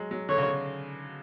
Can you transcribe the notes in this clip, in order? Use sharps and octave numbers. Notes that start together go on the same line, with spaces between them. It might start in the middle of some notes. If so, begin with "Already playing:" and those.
Already playing: F#3 G#3
F#3
D3 C#5
C#3
D3